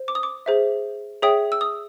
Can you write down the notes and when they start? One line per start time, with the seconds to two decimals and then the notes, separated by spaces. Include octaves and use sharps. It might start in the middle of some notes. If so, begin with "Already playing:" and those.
Already playing: C5
0.08 D6
0.15 D#6
0.23 D6
0.46 G#4 C5 E5
1.22 G#4 C#5 E5 G5 D#6
1.52 E6
1.61 D#6